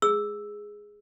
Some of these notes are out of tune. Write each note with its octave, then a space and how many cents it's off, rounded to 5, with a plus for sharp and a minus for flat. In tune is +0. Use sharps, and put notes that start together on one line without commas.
G#4 +0 E6 +0